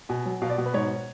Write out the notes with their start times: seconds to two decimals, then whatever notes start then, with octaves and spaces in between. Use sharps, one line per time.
0.09 B2 G#5
0.25 F#3
0.42 B2 F5
0.50 D5
0.58 B2
0.66 B4
0.74 G#2 C#5